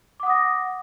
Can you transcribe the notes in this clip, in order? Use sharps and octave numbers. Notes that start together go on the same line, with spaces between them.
F#5 D6 D#6 A#6